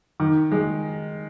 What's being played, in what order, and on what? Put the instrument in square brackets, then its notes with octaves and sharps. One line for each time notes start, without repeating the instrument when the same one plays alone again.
[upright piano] D#3
G#3